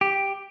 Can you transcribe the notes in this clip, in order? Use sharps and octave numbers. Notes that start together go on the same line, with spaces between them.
G4